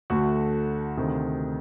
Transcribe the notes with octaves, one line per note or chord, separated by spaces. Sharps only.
D2 D3 A3 F#4
D2 C3 D#3